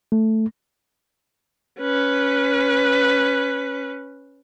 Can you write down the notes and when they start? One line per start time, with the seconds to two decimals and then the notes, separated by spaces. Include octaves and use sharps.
0.12 A3
1.80 C#4 B4